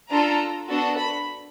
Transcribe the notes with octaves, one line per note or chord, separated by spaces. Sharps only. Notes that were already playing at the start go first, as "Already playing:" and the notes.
D4 F4 A4 A#5
B3 D4 F#4 A4
B5